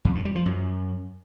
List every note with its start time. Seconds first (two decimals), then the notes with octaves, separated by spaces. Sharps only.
0.05 F2
0.15 G2
0.25 G3
0.35 F3
0.46 F#2